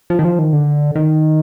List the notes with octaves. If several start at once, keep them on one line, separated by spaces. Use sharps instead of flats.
F3
D#3
F3
D#3
D3
D#3